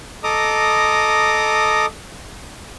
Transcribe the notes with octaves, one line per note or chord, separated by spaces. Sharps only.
A4 D#5 A#5 D6 D#6